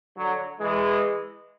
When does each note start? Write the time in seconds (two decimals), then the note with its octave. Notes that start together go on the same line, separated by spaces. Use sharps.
0.16 D3 F#3
0.60 E3 G#3